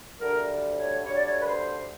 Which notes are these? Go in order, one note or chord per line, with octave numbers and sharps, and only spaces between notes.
D2 D3 G3 A#4
C5
C#5
D2 D3 G3 C#5
D5
C#5
B4
C5